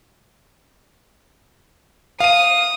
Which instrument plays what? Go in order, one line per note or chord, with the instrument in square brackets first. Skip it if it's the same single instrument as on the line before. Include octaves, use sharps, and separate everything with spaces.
[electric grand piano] F5 D#7 [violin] D#6